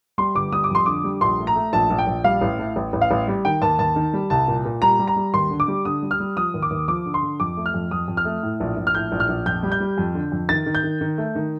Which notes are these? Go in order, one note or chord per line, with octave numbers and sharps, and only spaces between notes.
G3 C6
G1 D6
G3 D#6
D6
F2 C6
D3 D6
G3
A#1 C6
A3
A#5
A3
A#1 A5
A#1
G5
A#1
G3 F5
A1
A2
A1
A1
F5
A1
G3
D#3 G5
D#2 A5
D#2 A5
D#3
G3
C2 A5
A#2
A#2
G3 A#5
G3
A#5
G3
D#2 C6
D3
D6
G3
D3 D#6
G3
F6
G3
F3 D#6
D#2
D6
D#2
F3 D6
D3
C6
D3
F2 D6
A3
F6
F2
F2 D#6
F2
F6
A3
A2
A#1
A#1
F6
A2 G6
A#1
F6
A#1
F2 G6
G3
G6
G3
F2
D3
F2
D#3 A6
D#3
G6
D#3
D#3
A3
D#3